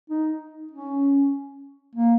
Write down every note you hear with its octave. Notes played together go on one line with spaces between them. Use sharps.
D#4
C#4
A#3